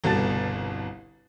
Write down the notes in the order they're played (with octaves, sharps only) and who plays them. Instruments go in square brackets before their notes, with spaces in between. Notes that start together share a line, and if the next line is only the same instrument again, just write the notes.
[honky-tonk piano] G1 C2 B2 A5 A6